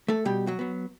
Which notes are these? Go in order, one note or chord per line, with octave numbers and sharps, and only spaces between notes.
A3 A4
B2 G3 G4
F#3 F#4
F#3 B3